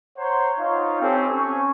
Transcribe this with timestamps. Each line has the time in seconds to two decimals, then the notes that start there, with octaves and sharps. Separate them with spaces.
0.18 C5 C#5 F#5 A#5 C6
0.59 D#4 F4 C#5 F5
1.02 C4 G4 A4 C#5 G#5
1.33 C#4 G#5 C#6